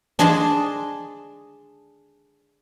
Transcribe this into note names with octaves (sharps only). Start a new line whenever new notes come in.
D4 G#4 D#5 A5 C6